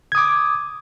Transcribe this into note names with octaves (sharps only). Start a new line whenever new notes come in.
D6 D#6 G#6